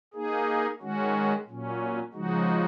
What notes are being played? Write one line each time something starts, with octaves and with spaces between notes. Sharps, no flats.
A#3 D#4 G#4
D#3 G#3 C#4 F#4
A#2 F#3 C#4
C#3 F3 G#3 D#4 F#4